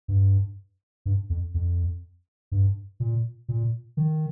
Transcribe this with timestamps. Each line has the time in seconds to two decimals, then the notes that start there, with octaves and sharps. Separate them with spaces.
0.08 G2
1.06 G2
1.30 F2
1.54 F2
2.52 G2
3.00 A#2
3.48 A#2
3.97 D#3